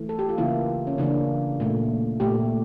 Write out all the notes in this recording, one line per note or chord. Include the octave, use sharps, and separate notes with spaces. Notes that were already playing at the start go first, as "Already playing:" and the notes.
Already playing: E3 A3
A4
G4
F4
C#3 E3 A#3 E4
C#4
C#3 E3 A#3 D4
A#2 A3
A#2 A3 G4